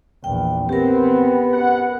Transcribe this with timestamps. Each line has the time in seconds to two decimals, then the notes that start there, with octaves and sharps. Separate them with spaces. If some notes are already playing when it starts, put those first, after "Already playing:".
0.24 A#1 E2 G5
0.69 B3 C4 G4 A#4
1.53 F#2 F#5